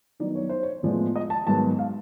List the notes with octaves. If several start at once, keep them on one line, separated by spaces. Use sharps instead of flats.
D#3 F#3 B3 D#4 D5
C#5
C5
C#5
A2 F3 G#3 B3 D5
D#5
A5
G#2 D#3 F#3 B3 A5
F5